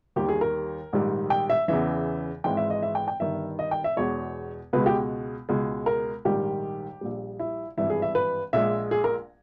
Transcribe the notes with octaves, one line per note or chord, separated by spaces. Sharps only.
D#2 D#3 G3 G4
G#4
A#4
A#1 G#2 D#3 G3
G5
E5
E2 C#3 E3 E5
G#1 G#2 E3 G#3 G5
E5
D#5
E5
G5
G5
G1 G2 D#3 E5
D#5
G5
E5
E2 B2 G#3 C#5
C#2 B2 G#3 B4
G4
C#2 B2 G#3
A#4
A#1 G#2 D#3 G3 G4
A#1 A#2 G3
E4
G#1 G2 E3 E4
G#4
E5
B4
A#1 A#2 G#3 E5
G#4
A#4